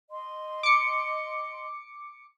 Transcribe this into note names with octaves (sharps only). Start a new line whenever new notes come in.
D#5 C6
D6 C#7